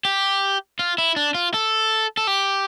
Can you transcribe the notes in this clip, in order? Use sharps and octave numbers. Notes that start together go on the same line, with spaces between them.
G4
F4
E4
D4
F4
A4
A4
G4